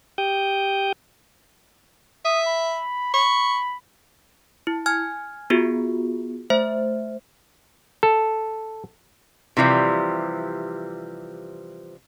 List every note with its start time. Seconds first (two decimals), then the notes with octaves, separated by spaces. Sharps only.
0.18 G4 G5 D#6 G6
2.25 E5 D#6
2.47 B5
3.14 B5 C#6
4.67 E4
4.86 G#5 F6 G#6
5.50 B3 F4 F#4 G#4
6.50 A3 C5 E5
8.03 A4
9.57 C3 E3 F3 G3